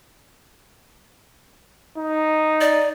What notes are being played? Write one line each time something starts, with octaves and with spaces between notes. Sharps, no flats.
D#4
D5